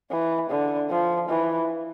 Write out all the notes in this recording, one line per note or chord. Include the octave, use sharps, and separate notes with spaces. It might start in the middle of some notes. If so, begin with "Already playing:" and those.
E3
D3
F3
E3